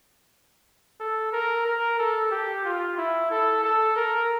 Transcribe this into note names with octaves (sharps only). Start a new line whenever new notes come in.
A4
A#4
A#4
A4
G4
F4
E4
A4
A4
A#4